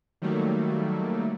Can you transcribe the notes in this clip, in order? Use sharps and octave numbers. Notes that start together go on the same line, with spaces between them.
D#3 F#3 G3 A3 A#3